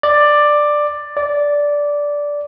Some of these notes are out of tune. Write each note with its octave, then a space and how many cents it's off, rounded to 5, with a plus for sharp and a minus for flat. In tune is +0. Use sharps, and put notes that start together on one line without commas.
D5 +10
D5 -10